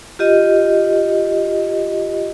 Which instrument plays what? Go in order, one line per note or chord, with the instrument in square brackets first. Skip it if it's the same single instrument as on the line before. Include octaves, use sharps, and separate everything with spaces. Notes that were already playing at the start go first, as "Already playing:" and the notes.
[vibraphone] F4 G4 D#5